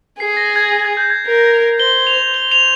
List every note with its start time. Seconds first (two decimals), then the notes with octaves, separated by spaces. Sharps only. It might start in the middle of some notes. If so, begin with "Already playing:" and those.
0.20 G#4 C7
0.37 A#6
0.56 G#6
0.73 A#6
0.85 G#6
0.97 G6
1.10 G#6
1.26 A#4
1.80 C5 G7
2.07 F7
2.34 C5 G7
2.52 F7